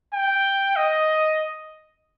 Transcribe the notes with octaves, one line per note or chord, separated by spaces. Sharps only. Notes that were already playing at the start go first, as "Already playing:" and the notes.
G5
D#5